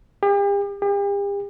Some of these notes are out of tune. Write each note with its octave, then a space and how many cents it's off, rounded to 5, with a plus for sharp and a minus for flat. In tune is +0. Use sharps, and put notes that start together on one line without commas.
G4 +40
G4 +40